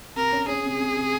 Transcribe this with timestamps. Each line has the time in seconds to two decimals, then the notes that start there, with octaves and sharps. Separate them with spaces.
0.16 C3 A#4
0.32 C#4
0.48 C#4 G#4
0.65 C3
0.80 C3
0.97 C3